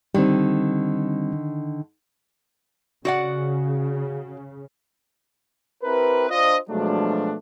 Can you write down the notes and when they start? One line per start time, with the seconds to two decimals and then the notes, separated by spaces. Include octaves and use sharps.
0.14 D3 D#3 G3 C4
3.05 C#3 F#4 D5 F#5
5.84 C4 E4 G4 A#4 B4
6.29 D4 F4 C5 D#5
6.70 B2 F3 F#3 G#3 A3 D4